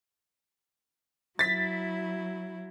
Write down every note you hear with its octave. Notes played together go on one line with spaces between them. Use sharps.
F#3 E4 A6 B6